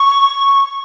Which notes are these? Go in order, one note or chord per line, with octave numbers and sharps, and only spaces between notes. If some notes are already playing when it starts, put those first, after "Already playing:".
Already playing: C#6